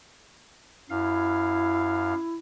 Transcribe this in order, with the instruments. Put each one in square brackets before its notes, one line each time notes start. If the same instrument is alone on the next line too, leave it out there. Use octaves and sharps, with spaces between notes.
[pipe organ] F#2 F5 [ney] E4